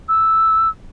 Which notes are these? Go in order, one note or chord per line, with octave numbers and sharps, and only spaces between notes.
E6